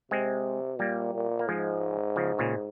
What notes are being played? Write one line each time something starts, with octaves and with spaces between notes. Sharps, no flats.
C3 G#3 C4
A#2 G3 A#3
A#2
A#3
G#2 F3 G#3
C#3 F3
A#2 C#3